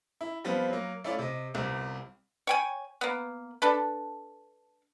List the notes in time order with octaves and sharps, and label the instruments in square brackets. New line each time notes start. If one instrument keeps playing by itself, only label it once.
[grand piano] E4
F3 G3 B3 C4 F4
F#3 A#3
A3 C#4 E4 F4 D5
C3 D#5
G1 C2 C3
[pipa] C#5 G5 G#5
A#3 B3
D4 A4 B4